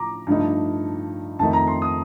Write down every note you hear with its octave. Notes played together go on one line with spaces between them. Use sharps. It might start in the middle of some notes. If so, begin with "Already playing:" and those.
Already playing: A2 F3 A#5 D6
G2 F3 A3 D#4
F2 D#3 A3 D#4 A5
A#5
C6
D#6